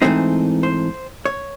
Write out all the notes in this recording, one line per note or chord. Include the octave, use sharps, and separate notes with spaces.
G#2 E3 A3 C4 D#4 C5
C5
C#5